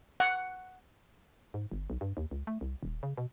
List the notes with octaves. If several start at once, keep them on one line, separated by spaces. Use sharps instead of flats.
F#5
G#2
G1
B1
G2
D#2
C#2
A3
C2
D#1
C#3
B2